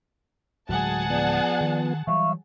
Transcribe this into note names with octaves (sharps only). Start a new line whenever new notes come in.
D1 F#3 G#3 G#4 F#5 A5
F3 B3 D5
D#3
E3 F#3 G3 E5 F5 C#6